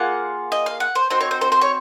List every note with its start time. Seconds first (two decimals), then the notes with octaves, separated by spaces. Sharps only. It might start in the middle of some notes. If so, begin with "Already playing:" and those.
Already playing: A#3 F4 G#4 F#5
0.52 D#5
0.66 F5
0.80 F#5
0.95 C5
1.10 C4 D#4 F#4 C5
1.21 C#5
1.31 C5
1.41 C5
1.52 C5
1.61 C#5